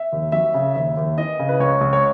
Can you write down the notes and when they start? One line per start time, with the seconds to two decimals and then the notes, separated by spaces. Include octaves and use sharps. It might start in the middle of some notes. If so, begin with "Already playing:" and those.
Already playing: E5
0.12 D#2
0.32 F#3 E5
0.54 C#3
0.76 D#2 E5
0.97 D#2
1.17 E3 D#5
1.39 C#3
1.49 B4
1.60 C#2 C#5
1.81 C#2
1.93 C#5